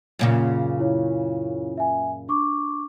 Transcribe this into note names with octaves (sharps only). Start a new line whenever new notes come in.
F#2 A#2 C#3
E4 C#5
E5 G#5
D4 C#6 D6